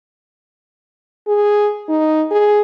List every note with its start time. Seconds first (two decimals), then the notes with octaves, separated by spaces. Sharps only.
1.27 G#4
1.89 D#4
2.31 G#4